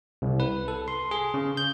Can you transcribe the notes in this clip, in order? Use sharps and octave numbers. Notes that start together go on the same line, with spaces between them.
C2
B4
A4
C6
G#4
C#3
G6